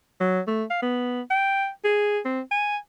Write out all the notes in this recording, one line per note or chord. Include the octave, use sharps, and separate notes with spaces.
F#3
A3
F5
B3
G5
G#4
C4
G#5